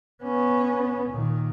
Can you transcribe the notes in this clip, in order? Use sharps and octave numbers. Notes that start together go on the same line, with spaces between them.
B3 C#4
A#2 D#3